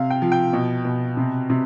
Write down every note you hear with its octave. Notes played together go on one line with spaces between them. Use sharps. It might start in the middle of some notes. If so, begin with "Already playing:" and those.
Already playing: C3 F5
G5
F3
G5
B2
B2
C3
C3